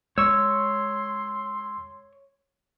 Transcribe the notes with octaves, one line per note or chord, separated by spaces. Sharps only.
G#3 C#5 C6 C#6 E6